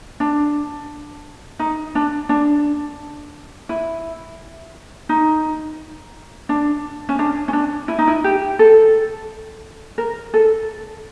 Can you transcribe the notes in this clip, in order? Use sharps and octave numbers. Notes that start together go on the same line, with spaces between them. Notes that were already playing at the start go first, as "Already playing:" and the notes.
D4
D#4
D4
D4
E4
D#4
D4
C#4
D4
C#4
D4
E4
D#4
E4
G4
A4
A#4
A4